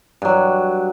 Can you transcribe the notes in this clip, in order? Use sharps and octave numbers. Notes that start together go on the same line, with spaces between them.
G2 F#3